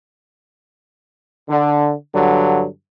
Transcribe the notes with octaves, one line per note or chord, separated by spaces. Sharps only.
D3
G2 D3 F#3